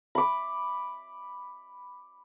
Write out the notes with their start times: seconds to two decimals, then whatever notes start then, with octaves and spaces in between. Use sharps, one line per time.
0.15 B5 D6